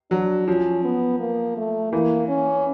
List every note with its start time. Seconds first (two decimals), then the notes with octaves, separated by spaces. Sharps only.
0.11 F#3 D4
0.47 F3 C#4
0.85 B3
1.20 A#3
1.57 A3
1.93 E3 A#3
2.28 C#4